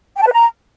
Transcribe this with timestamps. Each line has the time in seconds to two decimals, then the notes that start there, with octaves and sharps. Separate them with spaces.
0.14 G5
0.20 A5
0.26 B4
0.31 A#5